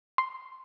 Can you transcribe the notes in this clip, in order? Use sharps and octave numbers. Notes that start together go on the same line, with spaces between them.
C6